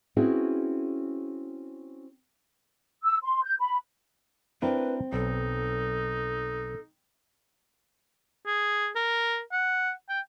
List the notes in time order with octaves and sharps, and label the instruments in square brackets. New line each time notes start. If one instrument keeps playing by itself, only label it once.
[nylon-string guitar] C4 C#4 E4 F#4 G#4 B4
[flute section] E6
C6
G6
B5
[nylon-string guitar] C4 [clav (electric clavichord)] D4 E4 A#4 [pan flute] B4
[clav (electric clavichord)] B1 [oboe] D#4 [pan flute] A4
[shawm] G#4
A#4
F#5
G5